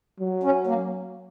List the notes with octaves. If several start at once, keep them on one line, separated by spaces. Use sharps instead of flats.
F#3
C#4
A#3